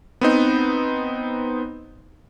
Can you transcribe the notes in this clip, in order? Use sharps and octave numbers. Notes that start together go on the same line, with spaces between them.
B3 C4 D#4